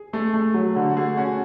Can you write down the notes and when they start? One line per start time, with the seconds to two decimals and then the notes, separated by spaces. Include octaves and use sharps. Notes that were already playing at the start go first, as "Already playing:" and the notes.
Already playing: G#4
0.13 A3 G#4
0.34 A3
0.54 F#3
0.76 D3 F#4
0.91 F#4
0.97 A3 G#4
1.17 C#4 F#4